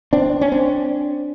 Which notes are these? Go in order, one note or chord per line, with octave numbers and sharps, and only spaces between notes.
C4 D4
C#4
C4 D4